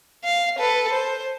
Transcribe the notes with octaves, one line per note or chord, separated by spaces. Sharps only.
F5
A4 B4
C5